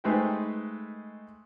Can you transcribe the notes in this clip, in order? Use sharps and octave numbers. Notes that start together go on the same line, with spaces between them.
G#3 A3 D#4 B4 C5 G5